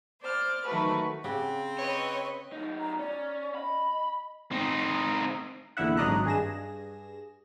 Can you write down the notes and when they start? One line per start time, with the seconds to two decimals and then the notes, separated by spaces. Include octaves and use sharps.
0.21 C5 D5 F6
0.66 D#3 F#3 A3 F#4 B4
1.24 C#3 C4 G4 F#5
1.79 B4 C#5 D#5
2.52 F#2 D#4
2.80 A#5
2.99 C#4 D5
3.55 D#5 B5
4.51 C4 D#4
5.77 A#1 E2 D3 E4 E5 F#5
5.97 G#1 F#3 D4 D#5 A#5 F#6
6.25 G2 G#4 A#6 E7